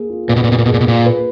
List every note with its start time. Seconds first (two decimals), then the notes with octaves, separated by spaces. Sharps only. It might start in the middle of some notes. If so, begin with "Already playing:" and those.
Already playing: A#3 G#4
0.10 F4
0.29 A#2 B4
0.36 B2
0.44 A#2
0.49 B2 A#3
0.59 A#2
0.66 B2 G#4
0.74 A#2
0.81 B2
0.87 A#2 F4
1.06 B4